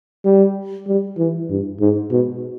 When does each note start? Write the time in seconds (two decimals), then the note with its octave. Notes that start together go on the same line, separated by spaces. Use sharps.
0.25 G3
0.88 G3
1.18 E3
1.50 G2
1.80 G#2
2.11 B2